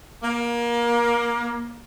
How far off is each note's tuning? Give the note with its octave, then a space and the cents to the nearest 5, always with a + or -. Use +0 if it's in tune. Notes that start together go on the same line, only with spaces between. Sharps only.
A#3 +25